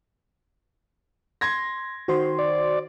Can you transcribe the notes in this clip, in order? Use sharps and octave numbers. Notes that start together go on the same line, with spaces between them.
C6 G#6 A#6
D#3 F#4 C5 C6
D5